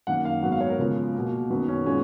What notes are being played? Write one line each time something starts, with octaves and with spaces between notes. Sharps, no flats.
F#2 D#3 A#3 F#5
F5
G#2 F#3 B3 F#5
F5
C#5
A#4
C#3 F3 G#3 B3
B2 A#3
F#2 D#3 F#3 B3
C#4
A#2 G#3 B3 C#4